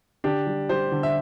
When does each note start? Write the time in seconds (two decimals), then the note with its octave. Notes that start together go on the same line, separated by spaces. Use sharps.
0.24 D3 D4 G4
0.47 G3
0.69 G3 G4 C5
0.92 D3
1.03 E5